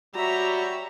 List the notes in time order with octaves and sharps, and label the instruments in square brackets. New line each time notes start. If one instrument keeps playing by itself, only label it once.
[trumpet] G3 [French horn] F#4 [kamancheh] C#5 E5 [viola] A#5